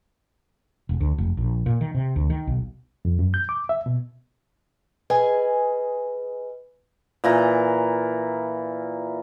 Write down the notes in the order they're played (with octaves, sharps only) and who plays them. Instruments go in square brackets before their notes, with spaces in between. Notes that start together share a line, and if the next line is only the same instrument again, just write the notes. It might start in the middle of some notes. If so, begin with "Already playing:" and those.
[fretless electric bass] E1
D2
F1
A#1
A#2
D#3
C3
D2
D#3
B1
[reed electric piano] F2
F#2
G6
D6
E5
B2
[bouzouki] G#4 D#5 G#5 [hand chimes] B4
[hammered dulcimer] A#2 E3 A#5